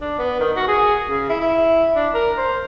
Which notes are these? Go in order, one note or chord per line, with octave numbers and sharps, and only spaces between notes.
D4
B3
D#3
F#4
G#4
C#3
E4
E4
D4
A#4
C5